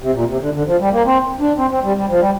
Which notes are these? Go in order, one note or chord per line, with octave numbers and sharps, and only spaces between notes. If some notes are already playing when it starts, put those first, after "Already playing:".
C3
A#2
C3
D3
D3
F3
G3
A#3
C4
D4
C4
C4
G3
G3
F3
G3